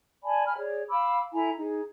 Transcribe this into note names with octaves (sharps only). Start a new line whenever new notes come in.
D5 G#5 A5 B5
G#5 B5 F6
G#4 C#5 D5
F5 B5 D6 E6
E4 A4 G#5 A#5
D#4 G#4